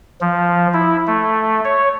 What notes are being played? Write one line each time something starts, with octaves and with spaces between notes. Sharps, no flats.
F3
E4
A3
C#5